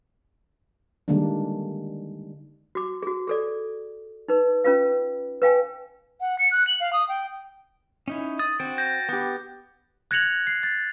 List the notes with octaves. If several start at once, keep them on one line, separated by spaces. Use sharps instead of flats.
D3 D#3 G3 G#3 A#3 D4
F#4 D6
F#4 G#4
G#4 A4 D5
D#4 B4
C#4 F4 B4 F5
B4 F5 G5 G#5
F#5
C#7
F#6
F#7
F5
D#6
G5
C#4 D#4 E4
D#6 A6
C4 F#4 G5
G6 A#6
B3 G4
F#6 G#6 A#6 C#7 F7 F#7
C7
A6